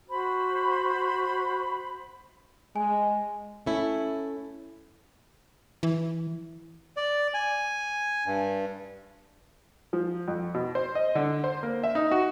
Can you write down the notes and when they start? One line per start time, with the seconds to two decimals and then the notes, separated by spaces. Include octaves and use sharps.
0.08 F#4 C5 B5
2.76 G#3 G#5
3.66 A3 C#4 E4
5.83 E3
6.97 D5
7.34 G#5
8.26 G2
9.93 F3
10.28 F2
10.54 B2
10.75 C5
10.95 D#5
11.15 D3
11.44 C5
11.63 A#3
11.83 E5
11.95 D#4
12.11 F#4